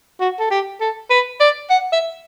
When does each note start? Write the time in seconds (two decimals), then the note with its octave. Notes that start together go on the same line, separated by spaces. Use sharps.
0.20 F#4
0.39 A4
0.51 G4
0.81 A4
1.10 B4
1.40 D5
1.70 F#5
1.92 E5